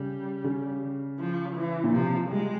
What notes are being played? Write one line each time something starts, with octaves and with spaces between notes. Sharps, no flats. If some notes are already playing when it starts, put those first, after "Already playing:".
Already playing: C#3 G3
C#3
F3
E3
A#2
C3 F3
G3 G#3